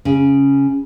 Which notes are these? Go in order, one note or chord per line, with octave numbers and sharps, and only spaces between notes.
C#3